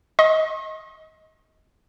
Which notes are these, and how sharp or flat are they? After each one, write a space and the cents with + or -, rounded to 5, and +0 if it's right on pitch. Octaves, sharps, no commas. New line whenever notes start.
D#5 +25 C#6 -45